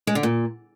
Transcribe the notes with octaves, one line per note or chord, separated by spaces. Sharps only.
G#3
D3
A#2